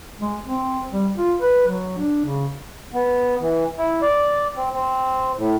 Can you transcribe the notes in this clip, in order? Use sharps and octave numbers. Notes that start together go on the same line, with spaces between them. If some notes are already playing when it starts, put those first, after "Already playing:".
G#3
C4
G3
F4
B4
F#3
D4
C#3
B3
E3
E4
D5
C4
C4
A2